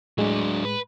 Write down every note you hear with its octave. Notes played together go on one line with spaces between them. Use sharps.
A2 F#3 G#3 D4
B4